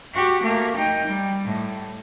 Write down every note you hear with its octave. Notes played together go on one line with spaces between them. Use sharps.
F#4 G4
A3 A#3
D#4 G5
G3
A2